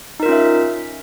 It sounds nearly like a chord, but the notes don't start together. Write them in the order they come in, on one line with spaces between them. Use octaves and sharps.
D#4 A#4 F4 C#4 E5